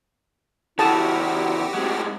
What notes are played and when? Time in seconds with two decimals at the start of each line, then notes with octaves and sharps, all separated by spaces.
0.79 C#3 E3 E4 F#4 G4 A4 A5 D#6
1.74 A2 G#3 C4